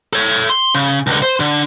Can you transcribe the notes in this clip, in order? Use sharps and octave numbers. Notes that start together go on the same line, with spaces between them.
A4 C#5
C6
C#3
C#2 D3
C5
D3